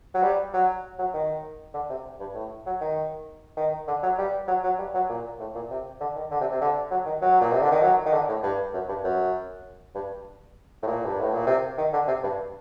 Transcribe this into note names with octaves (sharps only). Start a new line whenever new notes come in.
F#3
G3
F#3
F#3
D#3
D3
C3
G2
A2
F#3
D#3
D#3
D3
F#3
G3
F#3
F#3
G3
F#3
A#2
A2
A#2
C3
D3
D#3
D3
C3
C3
D3
F#3
D#3
F#3
A#2
C3
D3
D#3
F#3
D#3
D3
A2
G2
F#2
G2
F#2
G2
A2
A#2
G2
A2
A#2
C3
D#3
D3
C3
G2